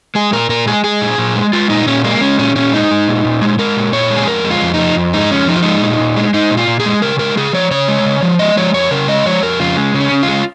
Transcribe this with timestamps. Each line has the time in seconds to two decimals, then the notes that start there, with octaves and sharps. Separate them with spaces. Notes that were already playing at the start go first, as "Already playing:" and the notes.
0.15 G#3 G#4
0.32 A#2 A#4
0.49 A#2 A#4
0.67 G#3 G#4
0.84 G#3 G#4
1.01 A#2
1.18 A#2
1.36 G#3
1.53 G#3 F4
1.70 A#2 D#4
1.87 A#2 C#4
2.04 G#3 A#3
2.21 G#3 C#4
2.39 A#2 C#4
2.55 A#2 C#4
2.73 G#3 D#4
2.91 G#3
3.08 A#2
3.25 A#2
3.42 G#3
3.59 G#3 A#4
3.77 A#2
3.93 A#2 C#5
4.10 G#3
4.16 G#4
4.27 F2 A#4
4.44 G#3
4.51 F4
4.62 F2
4.74 D#4
4.80 F3
4.96 F2
5.14 G#3 D#4
5.31 F2 C#4
5.48 F3 D#4
5.55 F4
5.62 G#3 D#4
5.82 A#2
6.00 A#2
6.16 G#3
6.34 G#3 D#4
6.51 A#2
6.57 F4
6.67 A#2
6.80 G#4
6.86 G#3
7.02 C#3 A#4
7.19 G#3 A#4
7.37 C#3 G#4
7.53 F3 C#5
7.71 C#3 C#5
7.88 G#3
8.06 C#3
8.22 F3
8.39 G#3 D#5
8.57 F3 C#5
8.74 F2 C#5
8.91 C#3 A#4
9.08 G#3 D#5
9.26 F3 C#5
9.42 F2 A#4
9.60 C#3 F4
9.77 G#3
9.94 C#3
10.00 C#4
10.11 C#3
10.23 F4
10.28 G#3